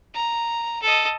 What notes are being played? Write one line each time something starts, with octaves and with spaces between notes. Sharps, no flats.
A#5
A4 D#5